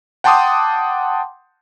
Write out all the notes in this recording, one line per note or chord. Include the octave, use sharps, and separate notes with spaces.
F#5 G5 A5 C6 D6 D#6